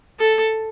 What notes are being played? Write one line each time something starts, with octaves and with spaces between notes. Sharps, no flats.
A4